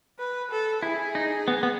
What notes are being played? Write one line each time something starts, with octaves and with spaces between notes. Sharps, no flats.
B4
A4
E4 G#4
D#4
B3
B3